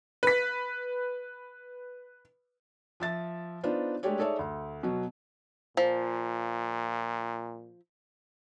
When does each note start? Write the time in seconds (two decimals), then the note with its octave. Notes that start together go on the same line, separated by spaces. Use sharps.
0.23 B4 B6
3.00 F3 E5 A6
3.63 B3 D4 D#4 F4 C5
4.03 G#3 A3 D4 G4 C#5 D5
4.18 D#4 G#4 A4 C#5 D5 E5
4.39 D2
4.83 B2 F#3
5.77 A#2 F3